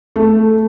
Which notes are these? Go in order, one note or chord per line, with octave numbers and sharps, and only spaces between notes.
A3